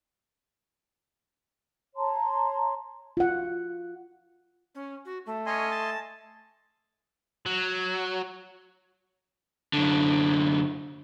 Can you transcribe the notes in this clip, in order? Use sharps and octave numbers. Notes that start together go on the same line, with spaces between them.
C#5 A5 A#5 C6
F4 F#5
C#4
F#4
A3
C#4 D#5 G#5 C6
A5
F#3
F#2 D3